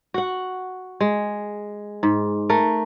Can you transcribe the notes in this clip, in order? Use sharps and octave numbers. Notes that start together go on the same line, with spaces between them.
F#4 F#5
G#3
G#2
A3 A#4